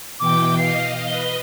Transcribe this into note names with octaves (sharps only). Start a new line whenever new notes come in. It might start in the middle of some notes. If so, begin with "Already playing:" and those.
B2 E3 G5 D6
D#5 F5 C7
B4 D#5 G7